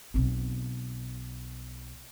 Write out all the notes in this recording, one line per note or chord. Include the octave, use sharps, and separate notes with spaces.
B1 C4